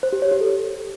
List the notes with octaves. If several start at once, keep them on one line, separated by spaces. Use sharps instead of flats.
C5
G4
C#5
G4
A4